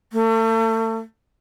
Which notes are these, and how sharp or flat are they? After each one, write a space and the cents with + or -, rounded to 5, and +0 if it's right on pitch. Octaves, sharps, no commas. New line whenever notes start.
A3 +35